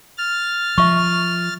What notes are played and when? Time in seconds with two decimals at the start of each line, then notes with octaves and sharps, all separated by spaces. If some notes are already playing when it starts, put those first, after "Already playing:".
0.18 F6 A6
0.78 F3 E5 C#6